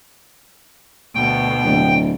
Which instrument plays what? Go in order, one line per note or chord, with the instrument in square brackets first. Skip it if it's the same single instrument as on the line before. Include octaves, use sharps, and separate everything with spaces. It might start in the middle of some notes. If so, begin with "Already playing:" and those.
[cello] D2 B2 [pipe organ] G5
[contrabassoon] D1